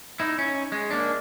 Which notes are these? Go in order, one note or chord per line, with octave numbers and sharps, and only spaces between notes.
D#4 E4
C#4
G#3
A#3 D4